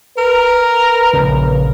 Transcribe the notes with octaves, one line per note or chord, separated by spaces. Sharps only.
A#4 B4
A#1 C#3